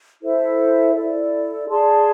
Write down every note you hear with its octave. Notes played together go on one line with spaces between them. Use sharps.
E4 A4 C5 E5
E4 A4 D5
G#4 D5 A5 C6